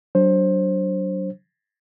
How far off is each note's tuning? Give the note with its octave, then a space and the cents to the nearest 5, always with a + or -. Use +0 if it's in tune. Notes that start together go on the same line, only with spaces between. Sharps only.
F#3 +25 D4 -10 C5 +20